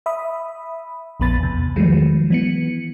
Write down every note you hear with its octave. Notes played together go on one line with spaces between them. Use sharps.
E5 B5 D#6
A#1 F2 B3 B5 A6
E2 C3
D#3 F3 F#3 G#3 A3
E3 B3 C#7